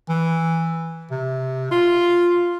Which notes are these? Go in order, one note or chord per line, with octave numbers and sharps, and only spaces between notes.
E3
C3
F4